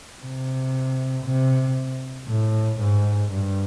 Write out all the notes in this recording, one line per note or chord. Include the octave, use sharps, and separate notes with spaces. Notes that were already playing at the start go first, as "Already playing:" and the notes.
C3
C3
A2
G#2
G2